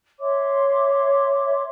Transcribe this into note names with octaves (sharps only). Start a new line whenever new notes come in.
C#5 E5 C6 D6